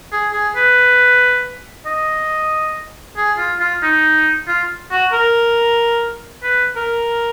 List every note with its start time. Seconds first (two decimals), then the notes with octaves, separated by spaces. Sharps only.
0.12 G#4
0.33 G#4
0.56 B4
1.86 D#5
3.17 G#4
3.38 F4
3.60 F4
3.82 D#4
4.48 F4
4.91 F#4
5.13 A#4
6.43 B4
6.76 A#4